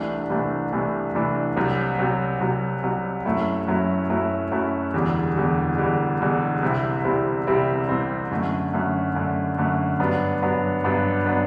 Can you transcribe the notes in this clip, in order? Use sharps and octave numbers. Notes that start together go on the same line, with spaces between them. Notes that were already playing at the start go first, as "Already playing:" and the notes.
Already playing: C2 C3 E3 A3 D4
C2 C3 E3 A3 D4
C2 C3 E3 A3 D4
C2 C3 E3 A3 D4
C2 C3 F#3
C2 C3 F#3
C2 C3 F#3
C2 C3 F#3
F#2 F#3 A3 E4
F#2 F#3 A3 E4
F#2 F#3 A3 E4
F#2 F#3 A3 E4
E1 E2 D3 G3
E1 E2 D3 G3
E1 E2 D3 G3
E1 E2 D3 G3
C2 C3 G3 C4 E4
C2 C3 G3 C4 E4
C2 C3 G3 C4 E4
C2 C3 G3 C4 E4
F#2 D3 A3
F#2 D3 A3
F#2 D3 A3
F#2 D3 A3
G2 F#3 B3 D4
G2 F#3 B3 D4
G2 F#3 B3 D4
F#3 B3 D4